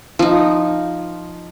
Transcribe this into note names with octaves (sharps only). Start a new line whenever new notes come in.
F3 D#4